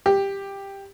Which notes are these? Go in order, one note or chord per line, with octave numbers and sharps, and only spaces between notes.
G4